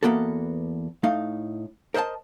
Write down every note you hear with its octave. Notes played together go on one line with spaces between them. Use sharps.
E2 A#3 B3 F#4 A4
A2 A3 D#4 F5
A#4 C5 D#5 F#5 A5